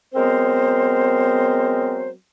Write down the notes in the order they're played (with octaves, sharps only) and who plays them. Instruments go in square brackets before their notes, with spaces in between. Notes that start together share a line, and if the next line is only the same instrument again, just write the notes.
[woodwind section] F#3 G#3 B3 C4 A#4 C5